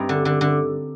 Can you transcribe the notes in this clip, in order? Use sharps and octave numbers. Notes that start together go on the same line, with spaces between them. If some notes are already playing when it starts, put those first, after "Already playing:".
Already playing: G2 C4 D#4
D3
D3
D3